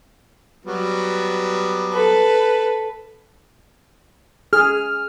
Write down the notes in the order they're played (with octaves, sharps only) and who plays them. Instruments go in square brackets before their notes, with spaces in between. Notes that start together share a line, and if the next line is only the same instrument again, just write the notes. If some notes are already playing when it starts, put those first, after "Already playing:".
[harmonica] F#3 G3 B3
[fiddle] A4 B4
[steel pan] G#4 [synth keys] F6